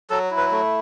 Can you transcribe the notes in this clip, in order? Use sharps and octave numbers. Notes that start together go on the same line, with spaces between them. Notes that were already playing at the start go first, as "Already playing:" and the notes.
F#3 A4
E4
B4
A3